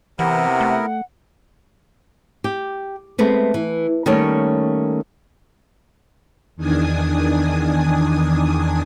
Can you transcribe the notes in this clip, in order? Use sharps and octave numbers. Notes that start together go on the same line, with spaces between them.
C3 E3 B3 E4 A#4 F#5
A3
G4
G#3 A3 B3 C4
E3
D#3 G3 A3 A#3 C#4 C#5
E2 D#3 D4 G#5 D#6